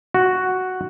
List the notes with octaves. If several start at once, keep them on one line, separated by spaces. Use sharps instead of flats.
F#4